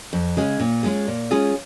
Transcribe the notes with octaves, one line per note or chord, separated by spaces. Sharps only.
F2
C#3 G#3 C#4 G#4
A#2
G#3 C#4 F4 G#4
A#2
G#3 C#4 F4 G#4